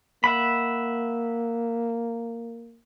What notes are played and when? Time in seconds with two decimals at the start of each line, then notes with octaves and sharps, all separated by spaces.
0.24 A#3 E5 F#5 B5